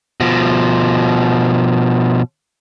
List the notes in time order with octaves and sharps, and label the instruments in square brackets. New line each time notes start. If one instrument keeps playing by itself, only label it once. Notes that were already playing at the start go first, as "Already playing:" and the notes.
[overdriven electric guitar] B2 F3